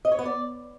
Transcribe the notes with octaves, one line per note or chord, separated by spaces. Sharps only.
D#5
C#5
B3
D5